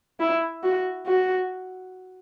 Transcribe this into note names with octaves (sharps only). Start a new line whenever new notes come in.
E4
F#4
F#4